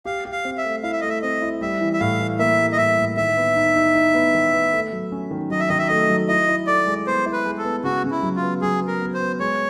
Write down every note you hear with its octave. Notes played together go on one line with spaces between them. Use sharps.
G4 F5
G4
F5
C4
E5
A3
E4 F5
E5
A3 D#5
E5
C4 D#5
E4
G3 E5
E3
E5
A2 F5
E3
A#3 E5
G3
D#5
A2 E5
A2
D#3 E5
B3
D#4
D#4
D#4
B3
D#3
B3
A3
F#3
C#4
D#3
F#3 D#5
E5
D#3 D#5
E5
A3 D#5
F#3
E4 D#5
E4
A4 D5
G#3
B3 C5
E4
B4
G#3
A4
B3
C#3 F#4
C#3
E4
F#3
F4
B3
F#3 G#4
B3
A#4
B3
C5
B3
G#3 C#5